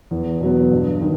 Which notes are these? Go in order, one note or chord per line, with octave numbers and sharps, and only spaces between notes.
E2
B2 F#3 B3
G2
D#3